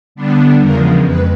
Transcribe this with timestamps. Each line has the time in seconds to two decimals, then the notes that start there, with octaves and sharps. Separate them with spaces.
0.15 D3 G3 B3 D4
0.60 E2 C#3 F3 G#3 A#4
1.05 F2 B4